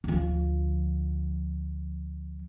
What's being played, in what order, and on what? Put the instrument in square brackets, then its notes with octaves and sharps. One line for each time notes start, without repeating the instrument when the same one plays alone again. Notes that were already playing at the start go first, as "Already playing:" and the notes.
[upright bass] D2 F3